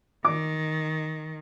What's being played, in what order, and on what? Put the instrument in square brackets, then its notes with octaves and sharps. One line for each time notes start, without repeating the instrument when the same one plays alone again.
[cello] D#3 [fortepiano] D6